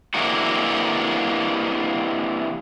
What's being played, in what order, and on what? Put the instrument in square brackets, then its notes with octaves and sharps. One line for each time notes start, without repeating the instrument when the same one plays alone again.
[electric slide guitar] C3 E3 G#3 A#3 D4 F#4